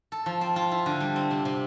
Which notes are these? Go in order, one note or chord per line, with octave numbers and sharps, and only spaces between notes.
A4
F3
C4
F4
E4
D3
G3
C4
C3
C3